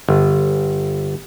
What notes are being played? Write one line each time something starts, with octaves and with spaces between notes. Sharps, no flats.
G1